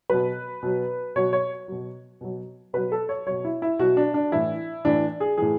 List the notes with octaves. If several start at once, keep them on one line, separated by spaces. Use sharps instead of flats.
B2 F#3 B4
B2 F#3
B2 F#3 C#5
C#5
B2 F#3
B2 F#3
B2 F#3 B4
A4
C#5
B2 F#3 C#5
E4
E4
B2 F#3 F#4
D4
D4
A2 E3 E4
A2 E3 D4
G#4
A2 E3 G#4